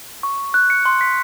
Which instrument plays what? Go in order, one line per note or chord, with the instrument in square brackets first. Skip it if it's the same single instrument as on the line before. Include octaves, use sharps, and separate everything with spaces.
[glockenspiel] C#6
F#6
C#7
C6
B6